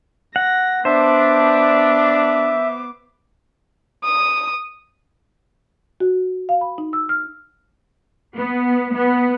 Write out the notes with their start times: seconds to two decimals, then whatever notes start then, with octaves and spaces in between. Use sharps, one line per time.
0.36 F#5 A#6
0.85 B3 D4 C5 E5 D6
4.04 D#6
6.00 F#4
6.49 F5
6.61 B5
6.78 D#4
6.93 E6
7.09 F6
8.37 B3
8.93 B3